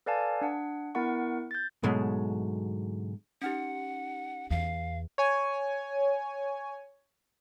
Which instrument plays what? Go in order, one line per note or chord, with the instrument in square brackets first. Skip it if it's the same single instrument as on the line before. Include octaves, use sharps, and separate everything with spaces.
[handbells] A4 B4 D5 F5 G#5 A5
D4 F#5
B3 E4 A#4 F#5 C#6
G6 A6
[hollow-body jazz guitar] G#2 B2 D3 F#3 G#3 A3
[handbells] C#4 D#4 G4 [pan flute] F#5
[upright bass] E2 [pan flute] F5
[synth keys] C#5 G#5